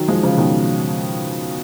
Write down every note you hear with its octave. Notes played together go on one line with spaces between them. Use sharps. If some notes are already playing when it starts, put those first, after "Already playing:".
Already playing: D#3 F#3
F3 G#3
C#3 F3
B2 D#3